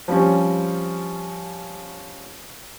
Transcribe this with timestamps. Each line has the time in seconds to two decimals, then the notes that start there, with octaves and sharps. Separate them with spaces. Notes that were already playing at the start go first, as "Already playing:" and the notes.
0.08 F3 G3 C4 C#4